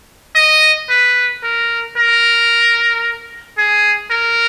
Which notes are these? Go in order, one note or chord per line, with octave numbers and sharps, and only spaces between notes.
D#5
B4
A#4
A#4
G#4
A#4